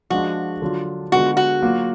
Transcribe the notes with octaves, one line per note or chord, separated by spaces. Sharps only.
F3 G#3 D4 F4 F#4
D3 F#3 D4 F4
D3 G#3 B3 F4 F#4
F#4
F#3 A#3 F4